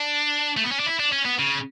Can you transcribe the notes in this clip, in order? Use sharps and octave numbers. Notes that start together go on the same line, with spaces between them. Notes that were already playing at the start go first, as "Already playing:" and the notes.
Already playing: D4
A3
B3
C#4
D4
E4
D4
C#4
B3
C#3